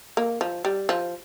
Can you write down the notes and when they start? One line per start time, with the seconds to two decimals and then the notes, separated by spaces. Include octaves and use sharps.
0.17 A#3
0.41 F3
0.65 G3
0.89 F3